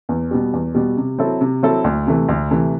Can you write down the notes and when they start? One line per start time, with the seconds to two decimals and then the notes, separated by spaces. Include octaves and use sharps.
0.09 E2
0.31 B2 G3
0.53 E2
0.75 B2 G3
0.97 C3
1.18 F#3 C4 E4 A4
1.41 C3
1.63 F#3 C4 E4 A4
1.84 D2
2.07 C3 E3 A3
2.29 D2
2.51 C3 E3 A3